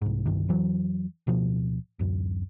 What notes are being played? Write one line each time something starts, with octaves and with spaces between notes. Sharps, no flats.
C2 G#2
G1 C2 G2 D#3
F2 E3 F#3
D1 B2 F3
D1 F#2